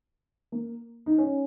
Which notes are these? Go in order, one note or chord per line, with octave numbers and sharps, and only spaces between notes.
A#3
D#4
C#4